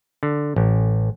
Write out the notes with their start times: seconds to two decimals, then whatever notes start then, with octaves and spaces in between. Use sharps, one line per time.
0.23 D3
0.56 A1